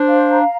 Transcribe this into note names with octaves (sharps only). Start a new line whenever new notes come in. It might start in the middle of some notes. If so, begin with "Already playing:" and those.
Already playing: D4 C5
F5
A#5